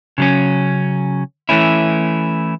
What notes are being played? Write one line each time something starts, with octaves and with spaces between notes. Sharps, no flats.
C#3 F#3 C#4
E3 A3 C#4 E4